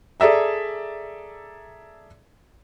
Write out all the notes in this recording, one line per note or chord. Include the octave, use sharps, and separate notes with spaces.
G#4 A4 D5 E5 A#5